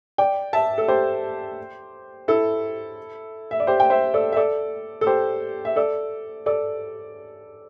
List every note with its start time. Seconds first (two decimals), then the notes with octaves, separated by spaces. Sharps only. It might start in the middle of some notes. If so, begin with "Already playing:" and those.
0.18 D5 G5
0.53 E5 A5
0.78 A4
0.88 G4 C5
2.28 E4 A4
3.51 E5
3.60 D5
3.67 G4 C5
3.80 G5
3.90 C5 E5
4.14 A4 D5
4.32 E5
4.37 A4 D5
5.01 A4
5.06 G4 C5
5.65 E5
5.76 A4 D5
6.46 A4 D5